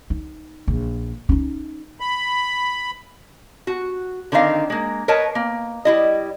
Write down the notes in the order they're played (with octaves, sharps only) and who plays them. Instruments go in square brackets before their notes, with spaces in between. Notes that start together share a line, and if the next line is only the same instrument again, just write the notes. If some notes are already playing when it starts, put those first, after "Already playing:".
[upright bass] D#4
A#1
C#4 D#4
[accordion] B5
[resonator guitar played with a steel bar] F#4
D3 D#3 C4 D#4 F5
G#3 A#3
A#4 B4 C#5 D#5 A5
A#3
G3 E4 D#5